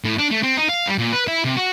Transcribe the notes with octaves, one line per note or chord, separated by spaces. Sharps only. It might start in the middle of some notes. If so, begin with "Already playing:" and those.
A2
D4
A3
C4
D#4
F5
G3
A#2
B4
E4
C3
F#4